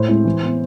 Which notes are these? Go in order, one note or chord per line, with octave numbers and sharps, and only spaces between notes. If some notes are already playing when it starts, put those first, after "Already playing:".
Already playing: A2 C5
G#3 C4 E4
E3
B3 E4